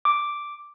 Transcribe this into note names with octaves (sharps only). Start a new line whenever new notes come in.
D6